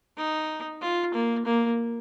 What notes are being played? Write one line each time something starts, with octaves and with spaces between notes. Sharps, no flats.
D#4
F4
A#3
A#3